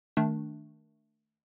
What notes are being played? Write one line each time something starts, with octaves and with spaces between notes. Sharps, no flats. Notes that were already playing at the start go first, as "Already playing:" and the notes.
D#3 A3 D4